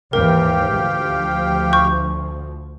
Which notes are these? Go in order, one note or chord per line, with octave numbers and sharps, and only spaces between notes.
D#2 G#2 E3 G4 A#4 F5 G5
D2 F3
C#6 G6